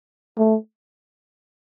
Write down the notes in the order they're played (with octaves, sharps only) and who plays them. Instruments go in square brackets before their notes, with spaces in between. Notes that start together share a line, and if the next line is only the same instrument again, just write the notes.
[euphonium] A3